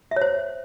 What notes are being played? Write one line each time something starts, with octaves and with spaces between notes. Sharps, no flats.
E5
C#5
C5